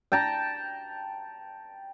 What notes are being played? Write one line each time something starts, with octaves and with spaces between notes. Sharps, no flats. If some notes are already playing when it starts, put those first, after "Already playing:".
G5 A5 A#5